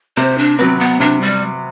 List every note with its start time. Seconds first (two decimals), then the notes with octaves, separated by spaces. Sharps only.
0.17 C3 C5
0.38 D4
0.58 F#3 B3 C4
0.80 B3
1.00 C3 D4
1.21 G3